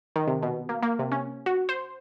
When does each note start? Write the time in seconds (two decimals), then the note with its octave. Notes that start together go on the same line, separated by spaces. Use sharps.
0.16 D#3
0.28 C3
0.42 B2
0.69 A#3
0.83 A#3
0.99 C3
1.12 C#4
1.46 F#4
1.69 C5